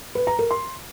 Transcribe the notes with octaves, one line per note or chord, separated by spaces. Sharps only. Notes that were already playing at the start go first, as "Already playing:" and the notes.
B4
A#5
A#4
C6